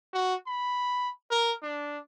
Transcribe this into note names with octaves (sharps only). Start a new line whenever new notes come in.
F#4
B5
A#4
D4